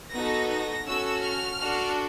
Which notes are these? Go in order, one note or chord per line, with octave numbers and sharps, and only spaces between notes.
B3 D#4 F#4 A4 A#6
A#6
C#4 F#4 A4 E6
F6
D4 F#4 A4